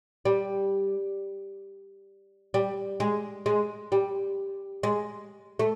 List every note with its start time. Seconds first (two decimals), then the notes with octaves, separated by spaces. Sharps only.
0.25 G3
2.54 G3
3.00 G#3
3.46 G#3
3.92 G3
4.83 G#3
5.59 A3